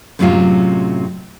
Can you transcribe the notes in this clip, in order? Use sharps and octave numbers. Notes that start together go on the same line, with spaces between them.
F#2 A2 C3 F#3 G#3 F4